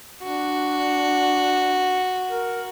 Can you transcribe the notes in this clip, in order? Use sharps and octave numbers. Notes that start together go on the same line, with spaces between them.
D4 F#4
A#4